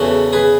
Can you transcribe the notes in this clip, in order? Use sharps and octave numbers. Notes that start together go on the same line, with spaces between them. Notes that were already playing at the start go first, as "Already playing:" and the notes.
Already playing: E2 C#3 E3 B3 F#4 A4
G#4 B4